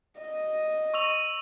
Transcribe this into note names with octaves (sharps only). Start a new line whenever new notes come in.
D#5
C#6 E6 F7